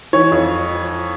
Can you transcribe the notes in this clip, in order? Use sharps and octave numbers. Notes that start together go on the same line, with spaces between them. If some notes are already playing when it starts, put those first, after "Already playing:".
E3 C#5
F2